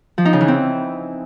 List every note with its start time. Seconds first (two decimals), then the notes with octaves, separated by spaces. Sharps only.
0.18 F3
0.25 D#4
0.33 C#3
0.41 E3
0.48 C4